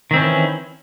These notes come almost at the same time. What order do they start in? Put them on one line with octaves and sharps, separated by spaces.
D#3 C4 C#4 E3